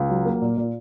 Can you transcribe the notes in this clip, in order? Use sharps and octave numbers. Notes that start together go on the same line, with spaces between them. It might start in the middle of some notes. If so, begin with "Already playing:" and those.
Already playing: C#2
F#3
A#3
A#2
A#2